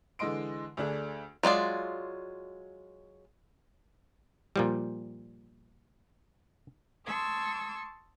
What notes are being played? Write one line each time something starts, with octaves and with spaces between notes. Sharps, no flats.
D3 E3 G#3 D#5 C6 D7
D2 A3 D4 G#4
F#3 G#3 F4 D5
A#2 F3 G3
A5 C6 C#6 D#6 E6 G#6